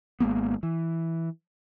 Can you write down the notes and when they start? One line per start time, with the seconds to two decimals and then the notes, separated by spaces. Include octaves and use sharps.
0.20 G#1 G#3 A#3 B3
0.63 E3